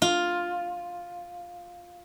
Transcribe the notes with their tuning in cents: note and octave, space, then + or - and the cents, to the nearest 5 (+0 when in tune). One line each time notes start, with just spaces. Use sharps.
F4 +5